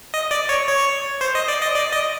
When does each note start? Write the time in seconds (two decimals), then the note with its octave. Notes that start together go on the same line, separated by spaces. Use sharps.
0.14 D#5
0.31 D5
0.49 C#5
0.68 C#5
1.21 C5
1.35 D#5
1.48 D5
1.62 D#5
1.76 D5
1.93 D#5